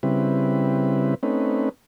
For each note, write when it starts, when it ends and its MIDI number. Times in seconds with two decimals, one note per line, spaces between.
0.03 1.15 49
0.03 1.15 55
0.03 1.15 60
0.03 1.15 64
0.03 1.15 71
1.23 1.69 57
1.23 1.69 60
1.23 1.69 61
1.23 1.69 63
1.23 1.69 71